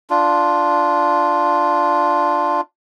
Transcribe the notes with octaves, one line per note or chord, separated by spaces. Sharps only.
D4 F4